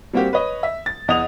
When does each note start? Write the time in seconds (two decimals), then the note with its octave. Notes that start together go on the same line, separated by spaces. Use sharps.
0.13 G3 A#3 C4 F#4 G4
0.33 B4 C#5 D#5
0.63 E5
0.86 A6
1.08 E2 D#5 F#5 D#6 F7